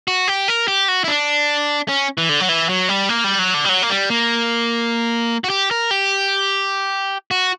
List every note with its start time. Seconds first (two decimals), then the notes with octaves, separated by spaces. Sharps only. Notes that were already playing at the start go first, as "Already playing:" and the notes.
0.08 F#4
0.28 G4
0.48 A#4
0.68 G4
0.88 F#4
1.04 E4
1.08 D4
1.89 C#4
2.18 E3
2.29 D3
2.40 F#3
2.49 E3
2.69 F#3
2.89 G3
3.09 A#3
3.24 G3
3.39 F#3
3.54 D3
3.65 G3
3.69 F#3
3.83 A#3
3.89 G3
4.10 A#3
5.44 F#4
5.50 G4
5.71 A#4
5.91 G4
7.31 F#4